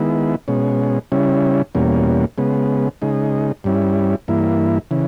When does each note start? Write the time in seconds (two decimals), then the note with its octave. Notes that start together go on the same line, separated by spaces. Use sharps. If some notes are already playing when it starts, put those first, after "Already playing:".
Already playing: D#3 G#3 B3 E4
0.48 B2 G#3 C#4
1.12 C#3 G3 C#4 E4
1.75 E2 B2 G3 A#3 C#4
2.38 C#3 G#3 B3
3.02 C#3 G#3 D#4
3.64 G2 G3 C#4 E4
4.28 G2 E3 A#3 E4
4.91 C#3 E3